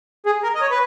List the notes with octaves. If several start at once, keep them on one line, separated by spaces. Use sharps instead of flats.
G#4
A#4
D#5
C#5
B4